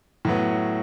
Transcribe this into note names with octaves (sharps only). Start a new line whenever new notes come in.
A2 F#3 B3